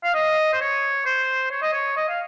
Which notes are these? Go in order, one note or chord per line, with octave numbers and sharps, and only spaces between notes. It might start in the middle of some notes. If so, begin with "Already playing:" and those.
F5
D#5
C5
C#5
C5
C#5
D#5
C#5
D#5
F5